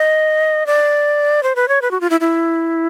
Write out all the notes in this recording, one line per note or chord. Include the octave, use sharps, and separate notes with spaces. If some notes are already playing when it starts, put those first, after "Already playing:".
Already playing: D#5
D5
C5
B4
C#5
B4
F#4
F4
E4
E4